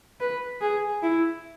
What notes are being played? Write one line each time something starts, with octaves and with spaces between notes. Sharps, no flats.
B4
G#4
E4